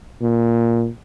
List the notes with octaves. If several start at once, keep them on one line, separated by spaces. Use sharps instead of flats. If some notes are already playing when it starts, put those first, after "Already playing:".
A#2